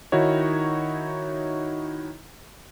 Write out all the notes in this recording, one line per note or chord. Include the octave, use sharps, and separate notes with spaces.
D#3 D#4 E4 F#4 C#5